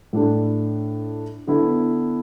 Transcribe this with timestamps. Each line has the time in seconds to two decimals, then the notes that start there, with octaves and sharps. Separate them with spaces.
0.13 A2 A3 D4
1.47 D3 B3 E4